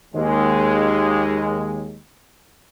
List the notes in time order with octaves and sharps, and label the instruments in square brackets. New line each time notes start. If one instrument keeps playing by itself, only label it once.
[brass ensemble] D#2 G#3